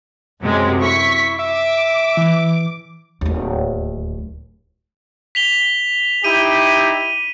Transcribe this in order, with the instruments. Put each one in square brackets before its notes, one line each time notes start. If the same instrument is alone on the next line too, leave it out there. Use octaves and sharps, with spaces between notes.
[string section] F#2 C3 G#3
[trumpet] E4 [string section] C#6 B6
[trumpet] E5 [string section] D6
[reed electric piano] E3
[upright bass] D1 D#2
[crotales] B6 F7 G7
[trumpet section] D#4 E4 G4 [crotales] D#7